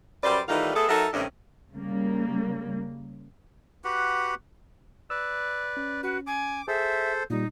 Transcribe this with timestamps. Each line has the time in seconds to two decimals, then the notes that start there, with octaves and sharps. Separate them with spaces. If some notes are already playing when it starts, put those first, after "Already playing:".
0.24 F#2 G3 B4 C5 D5
0.48 D#3 E3 G3 A3 D#4 F4
0.76 A3 B3 G#4 A4
0.89 F#3 D#4 A4 A#4 E5
1.13 G2 C3 D#3 A3 C#4 D4
1.75 C#3 G3 A#3
3.84 F#4 G4 B4 F#5
5.10 B4 D5 E6
5.77 C#4
6.03 F#4 B4
6.27 G#5 D6
6.68 G#4 A4 C5 E5
7.30 A#2 G3 D#4